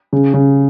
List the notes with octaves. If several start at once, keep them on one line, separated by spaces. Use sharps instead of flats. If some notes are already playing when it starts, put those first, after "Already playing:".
C#3
C#3